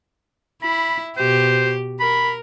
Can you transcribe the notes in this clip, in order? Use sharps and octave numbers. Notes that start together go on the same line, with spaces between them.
E4 B5
B2 G4 C5
A#4 B5